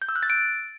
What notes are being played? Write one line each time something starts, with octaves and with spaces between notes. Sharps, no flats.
G6
E6
F#6
A6
D7